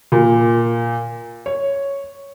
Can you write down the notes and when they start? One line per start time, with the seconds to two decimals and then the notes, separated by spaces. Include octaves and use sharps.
0.12 A#2
1.46 C#5